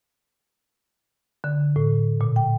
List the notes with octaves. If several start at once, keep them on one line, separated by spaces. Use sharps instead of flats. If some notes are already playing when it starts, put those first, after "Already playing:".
D3
A2
A#2
G5